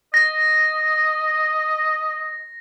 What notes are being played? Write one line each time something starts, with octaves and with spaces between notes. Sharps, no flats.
D#5 A#6